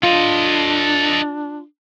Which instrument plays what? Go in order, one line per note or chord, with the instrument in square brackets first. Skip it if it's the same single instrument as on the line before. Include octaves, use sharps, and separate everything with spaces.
[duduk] D4 [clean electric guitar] F4 [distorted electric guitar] A4 D#5